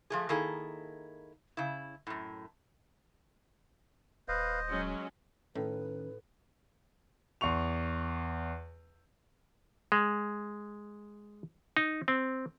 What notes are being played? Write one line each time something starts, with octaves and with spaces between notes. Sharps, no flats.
F3 A3 G#4
D#3 A#3 E4 G#4 A4
C#3 E4
F#2 A2
D#1 B4 C5 D#5 F5
F#3 G#3 C#4
A2 D#3 C#4 B4
E2 C6 C#6 F7
G#3
D#4
C4